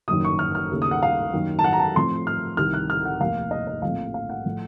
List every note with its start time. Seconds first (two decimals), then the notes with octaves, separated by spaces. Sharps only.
0.08 F#1 F#2 D#3 D#6
0.25 C#6
0.39 F6
0.55 F6
0.71 D#2 C#3 A3
0.82 D#6
0.91 F#5
1.03 F5
1.34 F#2 D#3 A#3
1.59 A5
1.64 F#5
1.73 A#5
1.79 A5
1.96 A2 F3 C4 C6
2.27 F6
2.57 C2 C3 D#3 F6
2.74 F#6
2.90 F6
3.05 F#5
3.20 F1 D#2 D#3 A#3 F5
3.51 D#5
3.67 D#5
3.82 A#1 A2 F3 A3 C4 F5
4.14 F5
4.30 F#5
4.45 A2 F3 A3